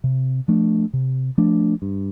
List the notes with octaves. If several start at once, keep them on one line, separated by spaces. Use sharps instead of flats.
C3
F3 A3 D4
C3
F3 A3 D4
G2